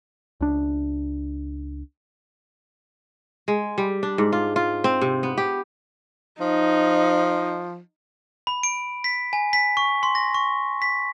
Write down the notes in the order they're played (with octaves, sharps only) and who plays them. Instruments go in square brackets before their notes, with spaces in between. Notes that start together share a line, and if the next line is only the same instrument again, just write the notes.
[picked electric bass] C#2 D4
[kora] G#3
G3
D4
G#2
F4
F4
C4
C3
B3
G4
[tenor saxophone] F3 [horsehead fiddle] D#4
[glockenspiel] B5
D7
B6
G#5
B6
C#6
C6
A#6
C#6
B6